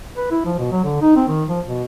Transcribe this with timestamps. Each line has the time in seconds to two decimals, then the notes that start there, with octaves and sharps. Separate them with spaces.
0.17 B4
0.31 E4
0.46 F3
0.59 B2
0.72 F#3
0.84 D3
1.02 D#4
1.16 C4
1.28 D#3
1.49 F3
1.67 B2